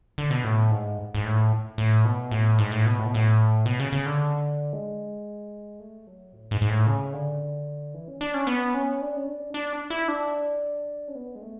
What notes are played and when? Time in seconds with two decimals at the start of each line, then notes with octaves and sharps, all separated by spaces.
0.18 D3
0.30 B2
0.44 A2
0.71 G#2
1.14 G#2
1.25 A2
1.78 A2
2.05 B2
2.31 A2
2.59 G#2
2.72 A2
2.86 B2
2.99 A2
3.06 B2
3.14 A2
3.66 B2
3.79 C#3
3.92 C#3
4.06 D3
4.73 G#3
5.80 A3
6.07 F#3
6.33 A2
6.51 G#2
6.62 G#2
6.69 A2
6.87 C#3
7.13 D3
7.94 E3
8.08 C#4
8.21 D4
8.34 C#4
8.47 B3
8.74 C#4
9.01 D4
9.16 C#4
9.28 D4
9.54 D4
9.90 E4
10.08 D4
11.08 C#4
11.15 B3
11.35 G#3
11.42 A3